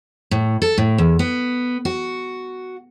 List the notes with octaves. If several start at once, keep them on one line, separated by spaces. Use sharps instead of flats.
A2
A4
A2
E2
B3
F#4